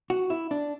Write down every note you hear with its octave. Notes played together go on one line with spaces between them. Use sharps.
F#4
E4
D4